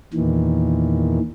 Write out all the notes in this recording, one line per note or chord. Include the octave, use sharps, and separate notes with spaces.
E2 A#2 D#3 E3